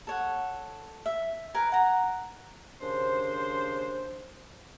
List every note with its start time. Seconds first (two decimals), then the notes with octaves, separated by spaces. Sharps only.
0.07 A4 C#5 F#5
1.06 E5
1.54 A#4 B4 G#5
1.72 F#5 A#5
2.81 D#2 C#3 D4 C5